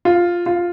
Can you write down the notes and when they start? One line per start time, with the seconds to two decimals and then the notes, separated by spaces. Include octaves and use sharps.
0.05 F4
0.46 F4